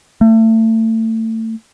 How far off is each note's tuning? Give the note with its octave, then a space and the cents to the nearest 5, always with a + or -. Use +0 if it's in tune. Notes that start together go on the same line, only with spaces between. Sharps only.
A3 +30